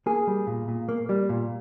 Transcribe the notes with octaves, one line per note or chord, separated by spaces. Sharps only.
A#3 G#4
G3
A#2
A#2
A#3
G3
A#2